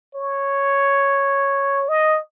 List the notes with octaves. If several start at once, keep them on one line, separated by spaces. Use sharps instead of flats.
C#5
D#5